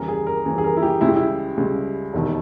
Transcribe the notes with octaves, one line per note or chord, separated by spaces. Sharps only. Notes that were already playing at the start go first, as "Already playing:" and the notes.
Already playing: D#2 C#3 E3 G3 A#4
G#4
A#4
D#2 C#3 E3 G3
G#4
A#4
E4
G4
C#2 C#3 G3 E4
G4
E4
C#2 C#3 G3
E1 D#2 D#3